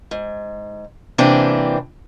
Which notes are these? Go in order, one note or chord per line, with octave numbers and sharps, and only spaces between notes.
G#2
C3 E3 A#3 C4 D4 G4